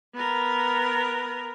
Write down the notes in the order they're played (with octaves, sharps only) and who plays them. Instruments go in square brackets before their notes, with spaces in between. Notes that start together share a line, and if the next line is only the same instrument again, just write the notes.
[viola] B3 A#4